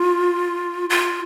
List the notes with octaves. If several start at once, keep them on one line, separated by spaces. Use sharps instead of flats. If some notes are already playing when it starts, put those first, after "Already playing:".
Already playing: F4
F4